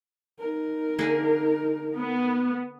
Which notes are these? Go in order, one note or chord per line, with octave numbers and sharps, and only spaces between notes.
D#4 A#4
D3 A#3 G#4
B3